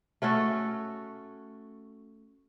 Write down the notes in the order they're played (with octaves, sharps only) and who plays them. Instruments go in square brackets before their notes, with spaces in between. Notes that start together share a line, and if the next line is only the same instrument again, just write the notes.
[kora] A3 C#4 F#4 A4